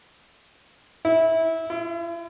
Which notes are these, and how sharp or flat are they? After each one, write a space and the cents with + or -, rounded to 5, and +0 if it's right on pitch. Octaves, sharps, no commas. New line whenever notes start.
E4 -15
E4 +45